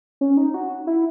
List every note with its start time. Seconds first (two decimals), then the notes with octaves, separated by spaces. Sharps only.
0.21 C#4
0.37 D#4
0.54 F#4
0.87 E4